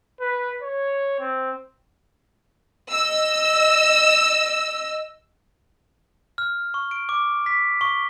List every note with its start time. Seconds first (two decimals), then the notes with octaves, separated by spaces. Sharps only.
0.20 B4
0.62 C#5
1.20 C4
2.91 D#5 E6
6.38 F6
6.74 C#6
6.91 D7
7.09 D6
7.46 B6
7.81 C#6